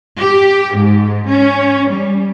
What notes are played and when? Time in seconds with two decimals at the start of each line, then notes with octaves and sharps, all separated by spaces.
0.17 G4
0.75 G#2
1.29 C#4
1.89 G3